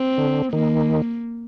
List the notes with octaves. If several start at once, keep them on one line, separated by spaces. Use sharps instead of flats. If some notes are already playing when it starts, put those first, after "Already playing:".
Already playing: C4
D3
D#3 A#3